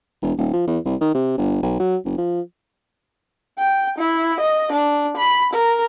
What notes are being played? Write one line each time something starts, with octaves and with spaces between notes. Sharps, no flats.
E1
D#1
F3
E2
C2
D#3
C3
G1
B1
F#3
F#1
F3
G5
E4
D#5
D4
B5
A#4